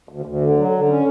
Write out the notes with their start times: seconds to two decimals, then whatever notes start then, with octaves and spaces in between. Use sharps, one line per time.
0.09 D2
0.26 D2
0.41 D3
0.57 F#3
0.72 D3
0.88 C#4